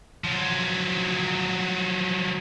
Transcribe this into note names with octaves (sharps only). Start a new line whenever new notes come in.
F3 F#3